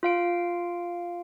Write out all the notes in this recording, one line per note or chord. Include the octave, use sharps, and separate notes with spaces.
F4 F5 D7